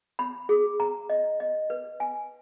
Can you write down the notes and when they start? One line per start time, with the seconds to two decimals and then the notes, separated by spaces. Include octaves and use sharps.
0.19 B5
0.49 G#4
0.80 A#5
1.10 D#5
1.40 D#5
1.70 B4
2.00 G#5